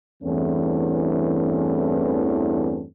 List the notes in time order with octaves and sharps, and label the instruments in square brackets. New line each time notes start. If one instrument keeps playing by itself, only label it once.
[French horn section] E2 G2 E3 A3 C4 C#4